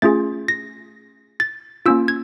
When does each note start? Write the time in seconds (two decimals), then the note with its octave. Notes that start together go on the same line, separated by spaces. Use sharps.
0.02 A3 C#4 F4 G#4 A6
0.48 A#6
1.40 A6
1.86 A#3 C#4 F4 E6
2.08 G#6